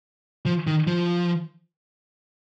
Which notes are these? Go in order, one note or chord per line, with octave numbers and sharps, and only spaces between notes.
F3
D#3
F3